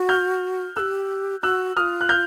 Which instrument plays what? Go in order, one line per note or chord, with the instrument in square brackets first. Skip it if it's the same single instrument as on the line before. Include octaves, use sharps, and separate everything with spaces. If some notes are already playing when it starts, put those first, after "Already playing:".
Already playing: [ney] F#4
[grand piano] F6 G6
[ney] G4 A4 [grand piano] E6 F#6
[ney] F#4 [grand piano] E6 F#6
[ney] F4 F#4 [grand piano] D#6 F6
[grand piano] F#6
F6 G6